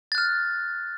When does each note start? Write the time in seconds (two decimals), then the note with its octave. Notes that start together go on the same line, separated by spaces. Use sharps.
0.12 A6
0.15 F#6
0.18 F6